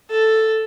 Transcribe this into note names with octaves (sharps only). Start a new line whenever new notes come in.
A4